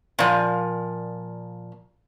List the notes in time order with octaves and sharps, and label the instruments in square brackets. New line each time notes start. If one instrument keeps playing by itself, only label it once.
[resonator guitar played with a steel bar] A#2 F3